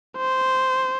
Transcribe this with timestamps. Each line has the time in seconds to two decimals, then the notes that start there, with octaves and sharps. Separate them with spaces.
0.18 C5